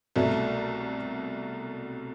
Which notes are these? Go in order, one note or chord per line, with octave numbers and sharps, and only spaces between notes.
C2 B2 F#3 A3